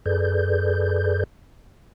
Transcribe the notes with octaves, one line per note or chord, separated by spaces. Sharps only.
F#2 G#4 A4 B4 D5 G6